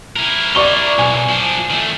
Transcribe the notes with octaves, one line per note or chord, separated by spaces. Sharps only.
E4 A#4
D5 C#6 G7
B1 G#5
F3 D4
D#3 A3